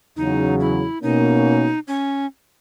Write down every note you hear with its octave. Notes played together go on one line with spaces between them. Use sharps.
E2 C#3 F#3 D#4
E4
B2 A#3 C#4 D#4
C#4